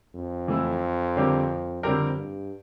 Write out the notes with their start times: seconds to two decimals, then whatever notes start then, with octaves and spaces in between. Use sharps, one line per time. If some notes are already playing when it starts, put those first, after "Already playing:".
0.15 F2
0.48 E3 A3 E4
1.16 D3 G3 C4 G4 A#4
1.83 F2 D3 G3 C4 G4 A#4
2.17 G2